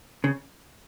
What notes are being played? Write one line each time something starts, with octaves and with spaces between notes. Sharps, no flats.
C#3